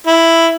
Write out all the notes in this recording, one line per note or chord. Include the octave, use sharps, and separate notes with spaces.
E4